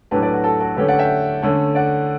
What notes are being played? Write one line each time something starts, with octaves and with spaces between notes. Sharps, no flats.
A2 F#3 A3 D4 G4 B4
B4 D5
F#4
F#4 A4
F#4 A4
D3 A3 C#4 G4 B4
D5 F#5
E5 G5
D3 A3 C#4
D5 F#5